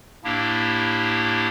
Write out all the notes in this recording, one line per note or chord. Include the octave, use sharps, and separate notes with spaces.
A2 A#3 D4 E4 G4